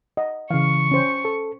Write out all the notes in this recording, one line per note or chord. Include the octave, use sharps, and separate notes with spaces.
D#5 F#5
C#3 E3 F5 C#6
C#4 C5
A4